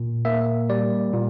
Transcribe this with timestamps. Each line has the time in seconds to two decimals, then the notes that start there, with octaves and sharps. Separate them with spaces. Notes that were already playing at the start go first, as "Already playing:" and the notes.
Already playing: A#2
0.25 A#3 E5
0.70 G3 D5
1.14 A#2